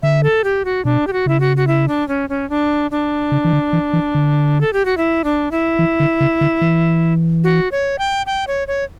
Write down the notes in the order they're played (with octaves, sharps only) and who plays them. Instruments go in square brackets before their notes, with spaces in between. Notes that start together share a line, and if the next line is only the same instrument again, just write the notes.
[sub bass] D3 [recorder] E5
[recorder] A4
G4
F#4
[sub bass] B2 [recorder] D4
[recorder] G4
F#4
[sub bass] C#3 [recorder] E4
[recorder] F#4
F#4
E4
D4
C#4
C#4
D4
D4
[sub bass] C#3
E3
D3
E3
E3
D3
[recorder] A4
G4
F#4
E4
D4
E4
[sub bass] E3
D3
C#3
D3
E3
[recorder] F#4
C#5
G5
G5
C#5
C#5